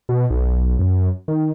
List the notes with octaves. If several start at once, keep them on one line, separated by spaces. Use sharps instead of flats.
B2
B1
F#2
D#3